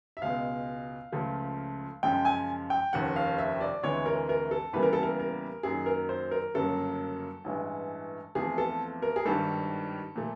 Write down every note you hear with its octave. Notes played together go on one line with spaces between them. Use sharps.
E5
C#2 B2 G#3 F5
C#2 C#3 F3 A3
F#2 C#3 F3 G#3 G5
G#5
G5
F1 D#2 C#3 F3 A#3 F#5
F5
E5
D5
D2 C3 E3 G#3 C#5
A#4
A#4
A4
E2 C#3 E3 G3 A#3 B4
A#4
A4
A#4
A#4
F#2 D#3 F#3 A#3 G#4
A#4
C5
A#4
G1 F#2 C#3 F#3 A#3 A4
A1 G2 E3 G#3
E2 C3 F3 A3 G#4
A4
A#4
G#4
G#1 G2 D#3 G3 A4
A#2 F3 A3